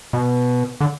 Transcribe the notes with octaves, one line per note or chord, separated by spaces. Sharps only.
B2
D3